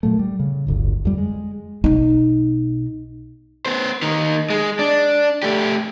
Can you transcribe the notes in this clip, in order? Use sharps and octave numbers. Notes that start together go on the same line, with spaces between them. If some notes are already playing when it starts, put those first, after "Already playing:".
A#2 F#3 A3
G3
C#3
D1 G1 D3
F2 G3
G#3
B1 D#4
B3 C5
D#3 A#3
G#3
D4
A3 G4